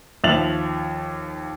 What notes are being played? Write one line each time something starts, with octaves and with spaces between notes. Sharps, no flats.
D#2 F3 E5 A6 F7 F#7